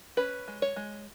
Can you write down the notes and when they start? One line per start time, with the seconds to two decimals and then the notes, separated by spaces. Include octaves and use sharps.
0.17 C#4 B4
0.48 G#3
0.62 C#5
0.76 G#3